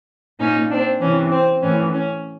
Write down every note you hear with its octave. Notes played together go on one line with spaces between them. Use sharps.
A#2 C#4 D#4
C4 D4
C3 E3 C#4
C4
A2 E3 C#4
C#4